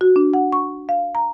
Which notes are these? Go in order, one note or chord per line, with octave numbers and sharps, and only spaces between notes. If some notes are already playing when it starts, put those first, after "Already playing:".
F#4
D4
F#5
C#6
F5
A#5